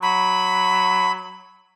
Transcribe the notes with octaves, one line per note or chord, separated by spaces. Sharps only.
F#3 B5